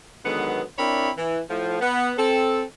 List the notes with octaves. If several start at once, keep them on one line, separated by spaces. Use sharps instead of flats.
D3 D#3 F#3 G#3 B3
C4 D4 E4 A#4 C#5 B5
E3
A2 F3
B3
C4 A4